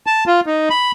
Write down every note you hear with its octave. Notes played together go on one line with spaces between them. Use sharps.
A5
F4
D#4
B5